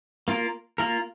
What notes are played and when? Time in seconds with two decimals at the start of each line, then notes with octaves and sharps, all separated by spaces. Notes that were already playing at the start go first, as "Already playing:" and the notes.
0.28 A#3 F4 A#4
0.78 A#3 F4 A#4